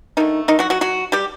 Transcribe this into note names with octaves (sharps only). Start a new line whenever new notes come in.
D3 D#3 A3 D#4
D#3 D#4
F#3 F#4
F#3 F#4
F#3 F#4
G3 G4